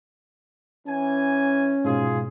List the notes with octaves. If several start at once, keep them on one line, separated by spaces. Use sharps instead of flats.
E3 C#4 G#5
G#2 B2 F4 G#4